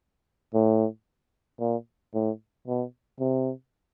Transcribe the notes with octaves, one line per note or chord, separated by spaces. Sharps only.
A2
A#2
A2
B2
C3